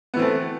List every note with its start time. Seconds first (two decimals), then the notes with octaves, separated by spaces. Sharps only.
0.14 B3
0.16 E3
0.19 C4
0.22 A3